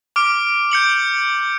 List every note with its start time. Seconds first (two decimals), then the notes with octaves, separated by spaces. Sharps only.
0.16 D6 F6 D7
0.72 G6 C#7 F#7